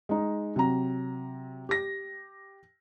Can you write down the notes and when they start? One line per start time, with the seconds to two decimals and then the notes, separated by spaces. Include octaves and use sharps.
0.09 G#3 D#4
0.56 C3 F#3 A#5
1.69 G4 A#6